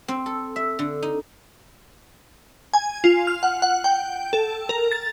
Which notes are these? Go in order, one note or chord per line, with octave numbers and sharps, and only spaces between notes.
C4
A4
E5
D3
D#4
G#5
F4
F6
F#5
F#5
G5
A4
A#4
A6